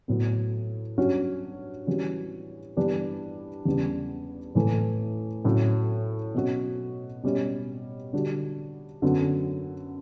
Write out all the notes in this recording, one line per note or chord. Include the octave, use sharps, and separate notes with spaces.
A2 F#3 B3
G2 F#3 C#4 F#4
E3 G3 C#4 F#4
G2 E3 G3 B3 D4
E2 C#3 G3 B3 D4
A2 E3 A3
A2 F#3 C#4
B2 F#3 C#4 F#4
B2 G3 C#4
D3 G3 D4 F#4
F#2 D3 F#3 B3